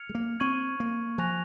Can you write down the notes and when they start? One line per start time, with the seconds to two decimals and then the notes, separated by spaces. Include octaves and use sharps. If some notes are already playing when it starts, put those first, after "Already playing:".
Already playing: F6 G#6 C#7 F7
0.09 G#3
0.15 A#3
0.40 C4 C#6 G#6 D#7 F#7
0.80 A#3
1.18 F3 G#5 C#6 F#6 A#6 F7